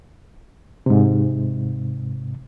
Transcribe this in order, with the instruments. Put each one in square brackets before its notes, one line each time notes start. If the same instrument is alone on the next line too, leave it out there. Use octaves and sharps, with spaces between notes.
[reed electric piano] G#2 C3